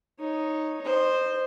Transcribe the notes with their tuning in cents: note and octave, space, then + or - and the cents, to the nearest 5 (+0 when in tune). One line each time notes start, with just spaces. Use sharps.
D#4 +0 C#5 -10
C5 +0 D#5 -30